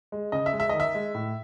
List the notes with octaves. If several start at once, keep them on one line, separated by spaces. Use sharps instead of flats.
G#3
C#3 D#5
E5
G#3
E5
D#3 D#5
E5
G#3
A2